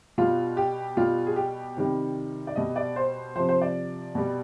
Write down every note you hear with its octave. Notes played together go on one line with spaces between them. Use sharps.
B2 G3 F4
G4
B2 G3 F4
G#4
G4
C3 D#3 G3
D5
B2 G3 D#5
D5
C5
C3 F3 C5
C5
D5
B2 G3